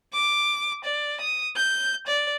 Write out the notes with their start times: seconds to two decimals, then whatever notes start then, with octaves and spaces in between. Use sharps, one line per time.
0.14 D6
0.85 D5
1.21 D#6
1.56 G6
2.07 D5